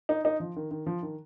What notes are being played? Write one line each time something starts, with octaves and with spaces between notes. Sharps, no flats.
D#4
D#4
F3
D#3
D#3
F3
D#3